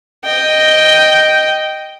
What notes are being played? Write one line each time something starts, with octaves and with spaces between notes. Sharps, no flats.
D#5 G5